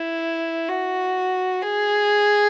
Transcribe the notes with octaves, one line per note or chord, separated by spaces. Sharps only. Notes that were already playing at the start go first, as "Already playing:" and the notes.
Already playing: E4
F#4
G#4